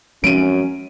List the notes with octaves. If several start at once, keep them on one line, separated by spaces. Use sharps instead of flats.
F#2 F3 G#3 C4 C#4 D7 D#7